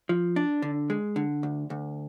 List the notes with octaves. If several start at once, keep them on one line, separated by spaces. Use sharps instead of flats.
F3
D4
D3
G#3
D3
D2
D2